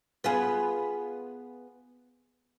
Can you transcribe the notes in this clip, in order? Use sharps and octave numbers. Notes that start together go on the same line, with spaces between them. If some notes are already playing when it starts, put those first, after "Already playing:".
B3 F4 G#4